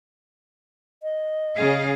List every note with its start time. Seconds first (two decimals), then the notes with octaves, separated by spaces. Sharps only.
1.03 D#5
1.57 C#3 G#4 F5